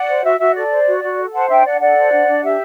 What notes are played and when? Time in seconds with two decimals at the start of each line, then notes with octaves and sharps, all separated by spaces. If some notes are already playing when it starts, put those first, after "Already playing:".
Already playing: D5 F#5
0.08 C5
0.23 F#4 E5
0.39 F#4 E5
0.54 A4 D5
0.71 C5
0.87 F#4
1.02 F#4
1.17 A4
1.33 C5 F#5 A5
1.48 D4 E5 G5
1.65 D4 D5 F#5
1.80 A4 D5 F#5
1.96 C5
2.11 D4
2.27 D4
2.43 G4 E5